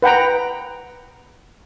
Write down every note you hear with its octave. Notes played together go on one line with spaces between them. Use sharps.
B4 F#5 G5 A#5